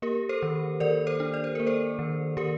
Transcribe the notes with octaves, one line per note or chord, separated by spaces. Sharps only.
A#3 G4 A#4
A4 C5
D#3
D#3 A#4 D5
A4 C5
D4
D5
C5
A#3 A#4
A4 C5
D#3
D#3 G4 A#4